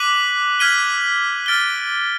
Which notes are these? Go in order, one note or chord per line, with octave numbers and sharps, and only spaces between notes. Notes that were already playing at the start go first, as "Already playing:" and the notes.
Already playing: D6 F#6 B6 D#7 F#7
F6 G#6 B6 D#7 G7
F6 A6 D7 G7